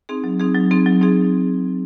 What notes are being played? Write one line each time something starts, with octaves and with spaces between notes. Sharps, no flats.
C4 D#4 G#4
F#3
C4 D#4 G#4
F#3
C4 D#4 G#4
F#3
C4 D#4 G#4